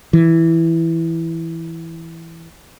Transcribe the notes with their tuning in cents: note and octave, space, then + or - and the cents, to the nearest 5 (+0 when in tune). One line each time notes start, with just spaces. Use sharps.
E3 +0